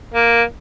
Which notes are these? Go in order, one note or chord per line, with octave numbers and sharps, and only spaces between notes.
A#3